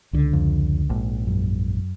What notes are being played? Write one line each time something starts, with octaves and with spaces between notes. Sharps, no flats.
C#2 D3
F2
A#1 G#2
F#2